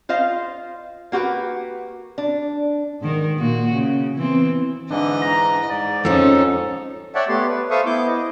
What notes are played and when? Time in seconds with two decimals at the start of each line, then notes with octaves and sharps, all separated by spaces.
0.09 F4 C5 D#5 F5
1.12 A#3 F#4 G4 B4
2.18 D4
3.02 G#2 D#3 A#4
3.38 A#2 A#3 F#4
3.73 C#3
4.16 E3 B3 C4
4.90 G#2 D3 E3 D#5
5.22 A#5
5.70 G#2 D5
6.05 F2 F3 C#4 D#4 A4
7.15 C#5 D5 E5 F#5 G5 A5
7.28 A3 B3 G4 C6
7.48 B4
7.71 A4 C5 E5 F5 C#6 D#6
7.86 B3 E4 D6 G6
8.07 D#5